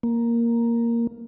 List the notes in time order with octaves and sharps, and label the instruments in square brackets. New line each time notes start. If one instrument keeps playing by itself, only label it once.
[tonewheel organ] A#3